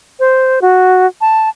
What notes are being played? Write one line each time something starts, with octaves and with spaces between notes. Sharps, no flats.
C5
F#4
A5